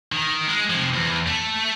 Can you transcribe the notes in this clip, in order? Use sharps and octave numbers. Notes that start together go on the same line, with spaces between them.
D#3
G#3
C3 F3
E2
A3